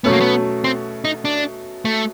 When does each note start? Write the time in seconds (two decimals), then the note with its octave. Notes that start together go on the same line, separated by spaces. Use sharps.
0.04 B2 F#3 A3 B3 C#4
0.13 A#3
0.20 B3
0.64 C4
1.05 D#4
1.25 D4
1.85 A3